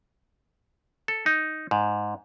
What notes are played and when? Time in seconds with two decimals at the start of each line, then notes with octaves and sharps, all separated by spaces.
1.08 A4
1.26 D#4
1.71 G#2